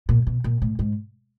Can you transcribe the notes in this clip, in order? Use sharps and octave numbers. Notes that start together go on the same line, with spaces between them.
A#2
B2
A#2
A2
G#2